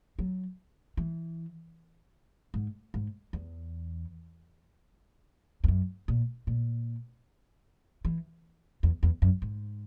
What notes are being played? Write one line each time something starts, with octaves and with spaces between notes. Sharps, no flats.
F#3
E3
G#2
G#2
E2
E2
F#2
A#2
A#2
E3
E2
E2
F#2
G#2